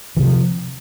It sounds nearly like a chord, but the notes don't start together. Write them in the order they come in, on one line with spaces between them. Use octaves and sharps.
E3 C3 F3